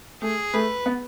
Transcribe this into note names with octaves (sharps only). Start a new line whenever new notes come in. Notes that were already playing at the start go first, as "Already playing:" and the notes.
A3 G#4
A3 B4
B3